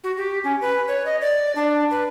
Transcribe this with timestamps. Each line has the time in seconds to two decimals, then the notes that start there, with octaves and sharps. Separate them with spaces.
0.04 F#4
0.17 G4
0.44 C#4
0.61 B4
0.88 C#5
1.06 D#5
1.21 D5
1.55 D4
1.91 B4